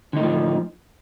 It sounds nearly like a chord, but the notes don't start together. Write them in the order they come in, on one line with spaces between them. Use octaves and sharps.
D3 D#4 A2 F3